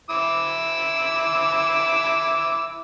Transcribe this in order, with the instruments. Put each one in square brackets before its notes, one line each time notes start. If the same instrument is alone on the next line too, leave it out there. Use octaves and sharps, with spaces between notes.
[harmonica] E4 D6 E6